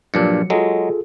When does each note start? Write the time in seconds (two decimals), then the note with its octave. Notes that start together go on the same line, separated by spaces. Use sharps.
0.14 G2 A#2 F3 F#3 D4 C#7
0.50 F#3 G#3 F4 G#4 A4